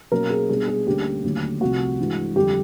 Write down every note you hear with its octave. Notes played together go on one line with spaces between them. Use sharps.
B2 F#3 A#3 C#4 A#4
G#4
B2 G3 B3 D4 G#4
G#4
D2 D3 G3 A#3 C#4 G4
D#2 D3 F#3 A3 C#4
C2 C3 F3 A3 F#4
G2 E3 G#3
F2 D3 G3 G4